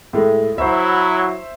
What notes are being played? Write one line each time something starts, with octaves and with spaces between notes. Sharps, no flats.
A2 G#3 A3
F#3 E4 C5 E5